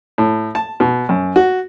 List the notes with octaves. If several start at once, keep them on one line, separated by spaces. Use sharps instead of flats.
A2
A5
B2
F#2
F#4